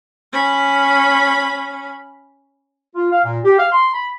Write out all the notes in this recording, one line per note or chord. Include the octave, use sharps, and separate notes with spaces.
C#4 B5
F4
F5
A#2
G4
F5
C6
B5